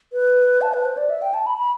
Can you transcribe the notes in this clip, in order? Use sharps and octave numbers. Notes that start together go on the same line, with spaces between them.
B4
A5
B4
C5
D5
E5
G5
A5
B5
B5